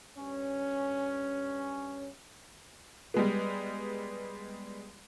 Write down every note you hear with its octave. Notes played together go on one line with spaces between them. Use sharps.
G2 C#4
G3 G#3 B3